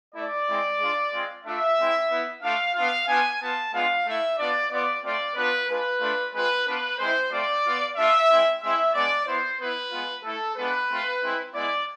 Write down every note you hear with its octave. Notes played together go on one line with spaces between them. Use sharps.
A3 E4 D5
G#3 C4 E4
G#3 D4 F4
G#3 C4 F4
A3 D4 F4 E5
G#3 C4 E4
B3 E4
A3 D4 F4 F5
B3 D4 F4 F5
B3 D4 F4 G#5
B3 F4 A5
G#3 B3 D4 F4 F5
A3 E4 E5
B3 D4 F4 D5
B3 F4 D5
A3 C4 F4 D5
B3 D4 F4 B4
G#3 D4 F4 B4
A3 D4 F4
G#3 C4 F4 B4
B3 D4 F4 B4
G#3 C4 E4 C5
A3 C4 F4 D5
B3 F4
A3 D4 F4 E5
G#3 C4 E4
G#3 C4 E4 E5
G#3 B3 D4 D5
B3 E4 C5
B3 E4 B4
G#3 B3 F4
A3 E4 A4
G#3 B3 D4 F4 B4
A3 C4 F4
G#3 C4 E4
G#3 B3 E4 D5